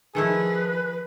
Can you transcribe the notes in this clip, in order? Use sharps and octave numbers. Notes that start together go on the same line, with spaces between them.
D#3 F3 A3 E4 G#4 B4